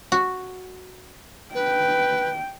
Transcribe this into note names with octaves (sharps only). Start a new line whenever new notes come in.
F#4
B4 G5